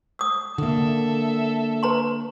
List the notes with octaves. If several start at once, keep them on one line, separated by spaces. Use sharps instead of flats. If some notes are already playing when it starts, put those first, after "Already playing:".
D#6 E6
D3 A#3 A4 E5
B4 A#5 C6